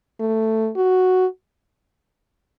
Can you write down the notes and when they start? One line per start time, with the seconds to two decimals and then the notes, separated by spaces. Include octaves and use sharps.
0.20 A3
0.76 F#4